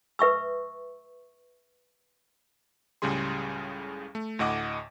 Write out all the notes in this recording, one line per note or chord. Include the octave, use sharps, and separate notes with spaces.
B4 E5 C#6 E6
C#2 A2 C#3 G3 G#4 C6
A3
D2 A2 D#5 F#5 D6